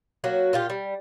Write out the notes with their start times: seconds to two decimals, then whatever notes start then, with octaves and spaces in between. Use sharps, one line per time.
0.24 F#3 A#3 F#4
0.53 A#2 F4 G4
0.70 G3